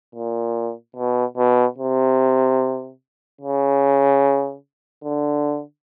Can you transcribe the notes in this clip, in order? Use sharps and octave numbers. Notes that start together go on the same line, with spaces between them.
A#2
B2
B2
C3
C#3
D3